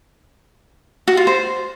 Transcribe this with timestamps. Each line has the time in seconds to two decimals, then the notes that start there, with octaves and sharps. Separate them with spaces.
1.08 F#4
1.17 F4
1.27 C5